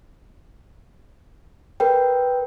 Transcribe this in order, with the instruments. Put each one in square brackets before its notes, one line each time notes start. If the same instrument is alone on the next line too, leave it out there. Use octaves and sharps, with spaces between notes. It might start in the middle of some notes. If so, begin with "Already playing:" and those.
[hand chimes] A#4 B4 G5